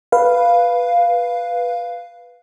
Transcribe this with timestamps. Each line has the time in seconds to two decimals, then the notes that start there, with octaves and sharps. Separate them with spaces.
0.12 B4 F5